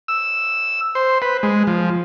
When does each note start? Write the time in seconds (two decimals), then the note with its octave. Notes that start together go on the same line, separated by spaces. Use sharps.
0.08 E6
0.95 C5
1.22 B4
1.43 G#3
1.67 F3